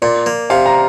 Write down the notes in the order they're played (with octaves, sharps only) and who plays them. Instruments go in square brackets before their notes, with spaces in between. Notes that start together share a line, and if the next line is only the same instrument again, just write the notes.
[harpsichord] A#2 [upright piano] D5
[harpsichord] A#3
[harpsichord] C3 [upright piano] F5
[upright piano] A#5